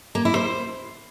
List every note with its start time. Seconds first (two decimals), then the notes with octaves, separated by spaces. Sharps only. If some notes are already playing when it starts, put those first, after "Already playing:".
0.15 A#3
0.25 E4
0.35 C5